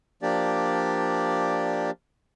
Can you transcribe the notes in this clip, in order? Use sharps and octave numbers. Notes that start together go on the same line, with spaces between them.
F3 A#3 D4 G4 D5